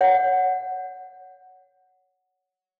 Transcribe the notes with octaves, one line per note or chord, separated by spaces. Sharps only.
C#5 F#5